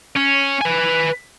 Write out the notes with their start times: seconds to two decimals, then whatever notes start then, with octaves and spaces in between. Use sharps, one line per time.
0.16 C#4
0.61 B4 G#5